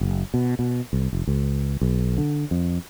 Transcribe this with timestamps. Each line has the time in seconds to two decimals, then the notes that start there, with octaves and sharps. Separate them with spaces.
0.01 F#1
0.34 B2
0.59 B2
0.93 C2
1.13 F1
1.27 C#2
1.81 B1
2.18 D3
2.51 F2